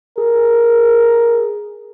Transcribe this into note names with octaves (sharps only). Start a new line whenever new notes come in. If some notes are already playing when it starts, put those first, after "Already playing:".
G#4 A#4